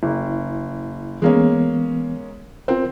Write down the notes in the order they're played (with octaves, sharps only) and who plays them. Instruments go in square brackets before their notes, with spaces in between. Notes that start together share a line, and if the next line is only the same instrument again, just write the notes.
[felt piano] F#1 [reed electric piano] E4
[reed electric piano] E3 B3 [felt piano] G#3 A#3 C#4
[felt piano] C4 [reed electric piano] F4 A#4 C5